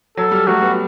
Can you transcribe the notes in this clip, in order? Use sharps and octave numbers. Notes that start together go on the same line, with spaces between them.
F#3 A4
G3
F#3 A3 F#4
G3 B3